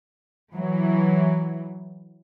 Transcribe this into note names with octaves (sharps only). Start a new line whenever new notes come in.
E3 F#3